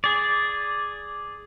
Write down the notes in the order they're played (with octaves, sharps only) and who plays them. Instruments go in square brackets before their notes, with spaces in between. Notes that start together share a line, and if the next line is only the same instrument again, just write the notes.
[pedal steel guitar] G#4 D5